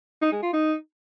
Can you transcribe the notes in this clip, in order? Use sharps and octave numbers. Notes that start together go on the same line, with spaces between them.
D#4
G#3
F4
D#4